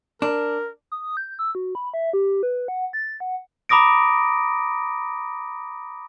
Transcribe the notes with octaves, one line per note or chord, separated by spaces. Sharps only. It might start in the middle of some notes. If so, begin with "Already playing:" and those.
D4 A#4
D#6
G6
E6
F#4
B5
E5
G4
B4
F#5
A6
F#5
A#5 B5 D6 D#6 A#6 D7